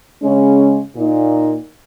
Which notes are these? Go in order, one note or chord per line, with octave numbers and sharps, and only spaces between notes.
C#3 G#3 C#4
A#2 A#3 D#4